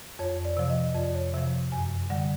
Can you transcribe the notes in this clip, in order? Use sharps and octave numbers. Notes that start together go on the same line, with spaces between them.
F2 C#5
D5
C3 F3
D#5
F2 D5
C#5
C3 F3 E5
F#2 G#5
D3 G3 F#5